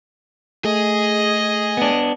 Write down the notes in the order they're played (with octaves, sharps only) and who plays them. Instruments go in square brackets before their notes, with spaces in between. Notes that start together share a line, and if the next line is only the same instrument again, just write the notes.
[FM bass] A3 [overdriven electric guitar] G#4 [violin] D#5
[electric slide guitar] B3 D4